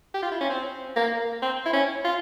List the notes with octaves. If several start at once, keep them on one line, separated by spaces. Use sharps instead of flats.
G4
F4
E4
C#4
C4
A#3
C4
E4
C#4
F4